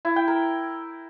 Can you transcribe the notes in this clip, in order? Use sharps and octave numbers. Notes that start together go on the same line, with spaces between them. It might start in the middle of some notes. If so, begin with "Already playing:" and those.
E4
G5
A#4